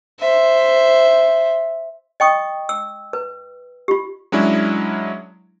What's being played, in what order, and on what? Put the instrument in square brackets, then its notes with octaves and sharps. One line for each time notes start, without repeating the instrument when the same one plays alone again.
[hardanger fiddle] C5 E5
[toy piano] D#5 G5 C#6 D#6
E6
B4
F4 G4
[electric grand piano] F#3 G#3 C#4 D4 E4